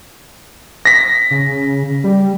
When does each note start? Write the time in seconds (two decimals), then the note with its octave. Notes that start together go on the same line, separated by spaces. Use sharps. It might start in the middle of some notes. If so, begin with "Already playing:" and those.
0.85 A#6 B6
1.31 C#3
2.04 G3